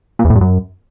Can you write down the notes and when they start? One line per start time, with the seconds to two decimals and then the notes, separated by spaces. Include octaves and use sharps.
0.19 A#2
0.25 E2
0.30 A2
0.35 G2
0.41 F#2